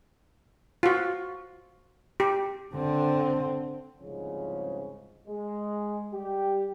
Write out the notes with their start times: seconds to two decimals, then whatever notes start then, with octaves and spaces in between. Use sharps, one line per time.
0.83 F4 F#4
2.20 G4
2.75 D3 C4
4.00 C2 G#2 C#3 F3 C#4
5.27 G#3
6.12 G3 G4